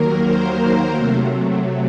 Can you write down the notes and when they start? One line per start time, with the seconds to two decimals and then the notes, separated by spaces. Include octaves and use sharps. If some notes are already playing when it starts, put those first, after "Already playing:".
Already playing: D#2 D#3 F#3 A#3 A#4
0.25 C5
0.95 C3 F#3 A3